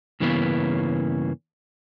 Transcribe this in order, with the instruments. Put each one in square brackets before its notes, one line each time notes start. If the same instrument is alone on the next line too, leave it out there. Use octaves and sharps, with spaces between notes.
[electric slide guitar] G2 C#3 E3 A#3 B3 C#4